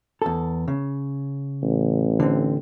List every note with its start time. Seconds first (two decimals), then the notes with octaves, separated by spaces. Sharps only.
0.22 E2 A4
0.68 C#3
1.63 A1
2.20 D3 C4